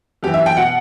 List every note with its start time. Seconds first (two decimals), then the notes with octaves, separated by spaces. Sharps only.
0.23 F#2 E3 G4
0.34 E5
0.46 G5
0.57 B2 F#5